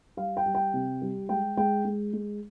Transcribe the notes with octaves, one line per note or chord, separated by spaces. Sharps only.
G3 F5
G5
G3
G5
C3
G3
G#3 G5
G#3 G5
G#3
G#3